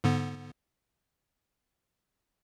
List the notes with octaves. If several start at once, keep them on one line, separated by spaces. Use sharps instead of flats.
G#2 D3 B3